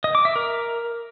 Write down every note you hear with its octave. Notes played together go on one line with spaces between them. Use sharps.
D#5
D6
E5
A#4